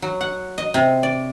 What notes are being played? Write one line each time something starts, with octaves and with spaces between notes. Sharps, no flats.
F#3
F#5
D#5
C3
D5